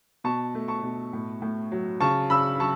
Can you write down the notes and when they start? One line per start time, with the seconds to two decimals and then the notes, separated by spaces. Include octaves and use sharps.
0.24 B2 A5 C#6
0.55 A3
0.68 A5 C#6
0.83 B2
1.13 A2
1.42 A2
1.72 F#3
2.01 C#3 A5 C#6
2.30 C#3 B5 E6
2.59 F#3 A5 C#6